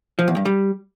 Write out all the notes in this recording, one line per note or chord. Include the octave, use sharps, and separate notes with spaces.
F3
E2
G2
G3